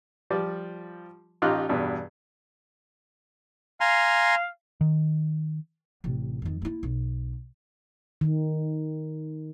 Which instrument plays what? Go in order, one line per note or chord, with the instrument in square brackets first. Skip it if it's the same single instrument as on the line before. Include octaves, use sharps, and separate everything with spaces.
[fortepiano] F3 G3 D5
A1 D#4 F4 G4 F6 F#6
E2 G2 B2
[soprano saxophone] F5 [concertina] G#5 A#5 C6
[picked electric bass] D#3
[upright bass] A1 C3
F2 D#3
A#3 E4
B1
[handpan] D#3